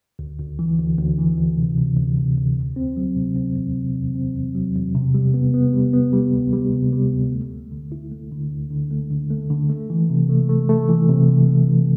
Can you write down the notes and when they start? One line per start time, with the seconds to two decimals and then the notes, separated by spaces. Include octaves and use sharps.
0.19 D2
0.39 D2
0.59 E3
0.78 D2
0.98 D2
1.18 E3
1.37 D2
1.58 C3
1.77 C3
1.97 D2
2.17 C3
2.37 D2
2.57 E2
2.76 C4
2.97 F#3
3.16 C3
3.36 C4
3.56 E2
3.76 C3
3.96 E2
4.15 C4
4.35 E2
4.55 F#3
4.75 E2
4.95 C3
5.14 G3
5.34 B3
5.54 B3
5.73 G3
5.93 B3
6.13 G3
6.33 D2
6.53 G3
6.73 C3
6.93 G3
7.13 D2
7.32 A3
7.52 D2
7.72 D3
7.92 E4
8.11 A3
8.31 D3
8.51 D2
8.70 D3
8.91 A3
9.10 D3
9.30 A3
9.50 D3
9.70 A3
9.90 E3
10.10 C3
10.29 A3
10.49 A3
10.69 A3
10.89 E3
11.09 C3
11.28 E3
11.48 E3
11.68 E3